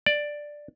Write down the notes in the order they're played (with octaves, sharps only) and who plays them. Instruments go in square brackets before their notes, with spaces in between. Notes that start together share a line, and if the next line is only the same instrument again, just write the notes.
[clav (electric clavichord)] D5